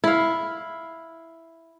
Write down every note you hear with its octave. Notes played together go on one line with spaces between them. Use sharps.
E4 F5